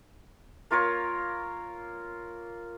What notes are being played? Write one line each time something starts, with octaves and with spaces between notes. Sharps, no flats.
A#3 F4 A#4 C#5